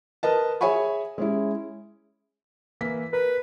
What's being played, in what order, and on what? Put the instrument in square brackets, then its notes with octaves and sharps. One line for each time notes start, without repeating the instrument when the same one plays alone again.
[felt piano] A#4 B4 D#5 A5
G#4 C#5 E5 G#5 B5 C#6
G#3 C#4 E4
E3 A#3 B6
[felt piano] A#4 [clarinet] B4